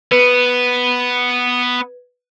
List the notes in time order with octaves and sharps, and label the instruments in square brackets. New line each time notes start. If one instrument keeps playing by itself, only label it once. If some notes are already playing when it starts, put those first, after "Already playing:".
[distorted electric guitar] B3 [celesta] B4